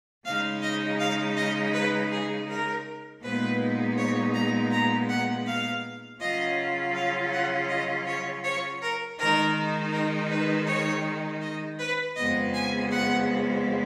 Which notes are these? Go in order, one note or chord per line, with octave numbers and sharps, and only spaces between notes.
C#3 G#3 D#4 F5
D#5
F5
D#5
B4
G#4
A#4
A#2 G#3 B3 D#4 B4
C#5
A#5
A#5
F#5
F5
C#3 F#3 C#4 F4 D#5
F5
F#5
D#5
C#5
C#5
A#4
D#3 G#3 D#4 A#4
A#4
B4
C#5
D#5
B4
F2 C#3 G#3 B3 D#5
G#5
F#5